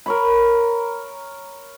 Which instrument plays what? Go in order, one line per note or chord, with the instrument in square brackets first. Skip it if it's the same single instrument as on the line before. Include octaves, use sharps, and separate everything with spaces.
[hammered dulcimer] A#4 C#5 B5